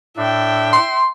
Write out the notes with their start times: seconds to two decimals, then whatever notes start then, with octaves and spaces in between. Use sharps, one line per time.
0.17 A2 D4 E5 G5
0.73 C6